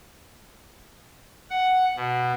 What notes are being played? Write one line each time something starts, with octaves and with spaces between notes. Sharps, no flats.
F#5
B2